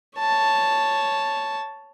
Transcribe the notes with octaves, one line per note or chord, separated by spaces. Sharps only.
C#5 A5